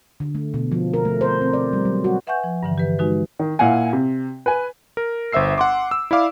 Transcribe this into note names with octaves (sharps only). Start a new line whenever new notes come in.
D3
A3
B2
F3
A#4
A3
C5
C4
D5
G3
F#3
F#4
B4 E5 F#5 G#5 C#6 G6
F3
G2 D3 E3
G4 B4 E5
G#3 D#4 F#4 B4
D#3
A#2 E4 F5 F#5 G#5
C3
B4 G#5
A#4
G1 C5 E5 E6 C7
F#5 C6 D6
E6
E4 D5 F5 D6